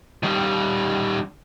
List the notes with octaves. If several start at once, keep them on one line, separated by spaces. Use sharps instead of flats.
D#3 G3